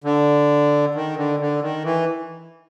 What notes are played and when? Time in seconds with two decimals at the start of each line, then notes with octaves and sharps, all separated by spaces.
0.04 D3
0.95 D#3
1.17 D3
1.40 D3
1.63 D#3
1.84 E3